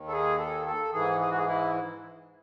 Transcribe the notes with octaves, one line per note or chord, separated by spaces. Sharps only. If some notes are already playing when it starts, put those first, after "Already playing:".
Already playing: D#2 D#3
A4
G#4
A4
A4
G#2 E3 G#4
G#4
F#4
G#4
E4